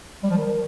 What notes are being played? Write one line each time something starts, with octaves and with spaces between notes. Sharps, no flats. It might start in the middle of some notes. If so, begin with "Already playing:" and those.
G3
F3
D#3